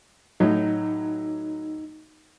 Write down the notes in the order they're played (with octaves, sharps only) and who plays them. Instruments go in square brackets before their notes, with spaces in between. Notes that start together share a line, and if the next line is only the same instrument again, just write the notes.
[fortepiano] A2 F#3 [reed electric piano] D#4